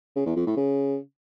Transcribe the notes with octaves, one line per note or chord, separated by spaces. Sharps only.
C#3
E2
F2
A2
C#3